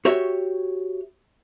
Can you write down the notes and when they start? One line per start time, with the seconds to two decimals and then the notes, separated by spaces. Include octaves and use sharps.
0.05 F#4 G4 C#5 E5